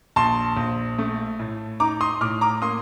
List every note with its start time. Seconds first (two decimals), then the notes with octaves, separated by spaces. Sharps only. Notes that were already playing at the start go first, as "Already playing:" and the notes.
0.16 A#1 A5 C6
0.57 A#1
0.98 A3
1.39 A2
1.80 D#4 A#5 D6
2.01 C6 D#6
2.21 A2 D6 F6
2.41 A#5 D6
2.62 A#3 C6 D#6